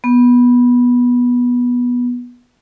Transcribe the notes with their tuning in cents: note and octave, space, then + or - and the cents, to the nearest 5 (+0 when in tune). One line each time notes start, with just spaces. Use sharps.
B3 -15